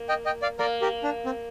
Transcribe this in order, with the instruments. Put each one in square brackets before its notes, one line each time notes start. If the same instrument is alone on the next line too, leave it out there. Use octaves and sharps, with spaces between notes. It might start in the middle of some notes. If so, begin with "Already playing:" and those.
Already playing: [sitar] A#3
[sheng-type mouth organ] D#5 G5
D#5 G5
D5 F5
[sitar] A#3 [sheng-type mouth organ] A#4 D5
[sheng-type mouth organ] G4 A#4
D4
C4